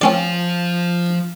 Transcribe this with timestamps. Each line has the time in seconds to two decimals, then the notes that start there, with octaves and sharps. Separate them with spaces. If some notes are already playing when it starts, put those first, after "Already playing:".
0.01 F3 C4 C#4 F4 D5